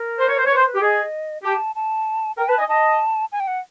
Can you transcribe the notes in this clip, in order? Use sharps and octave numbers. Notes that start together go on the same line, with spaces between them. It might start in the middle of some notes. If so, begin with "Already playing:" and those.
Already playing: A#4
C5
C#5
C5
C#5
B4 C5
B4
G4
G#4 D#5
G4 A5
A5
A#4 G5
B4 A5
D#5 G#5
D#5 A5
G#5
G5
F#5